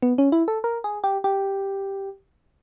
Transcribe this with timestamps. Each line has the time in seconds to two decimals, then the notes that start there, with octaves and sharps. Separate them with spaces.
0.03 B3
0.18 C#4
0.32 E4
0.48 A4
0.64 A#4
0.84 G#4
1.04 G4
1.24 G4